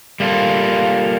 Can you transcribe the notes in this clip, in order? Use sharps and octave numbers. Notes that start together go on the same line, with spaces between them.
G3 A#3 F4 A4